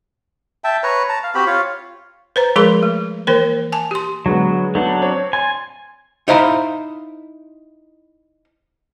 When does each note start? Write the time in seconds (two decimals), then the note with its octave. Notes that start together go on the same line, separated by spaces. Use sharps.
0.64 E5 G5 A5
0.83 B4 C#5 A#5
1.09 A5 A#5
1.23 F5
1.35 C4 F#4 G4 B5
1.47 F4 C#5 F5
2.36 B4 C5 A#5
2.56 F3 G#3 G#4 A#4 B5 C6
2.83 A3
3.27 E3 A#3 A#4 C5
3.72 G#5 A5
3.91 G4 C6
4.26 D3 F#3 G#3 B3
4.75 F#3 A3 B3 D4
5.02 C4 C#5
5.33 G#5 C6 A6
6.28 D#4 E4 C5 F5 A#5 B5